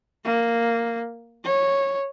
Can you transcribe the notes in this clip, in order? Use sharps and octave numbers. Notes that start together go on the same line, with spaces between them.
A#3
C#5